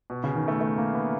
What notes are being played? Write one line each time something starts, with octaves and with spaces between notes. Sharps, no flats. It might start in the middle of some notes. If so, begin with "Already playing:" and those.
B2
C#3
D#3
A3
A3
A#3
B3